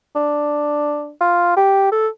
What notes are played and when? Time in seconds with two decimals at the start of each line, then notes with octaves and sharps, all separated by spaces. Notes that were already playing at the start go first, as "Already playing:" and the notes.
0.16 D4
1.21 F4
1.57 G4
1.92 A4